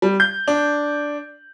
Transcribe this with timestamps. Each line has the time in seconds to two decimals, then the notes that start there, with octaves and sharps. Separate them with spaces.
0.02 G3
0.20 G6
0.48 D4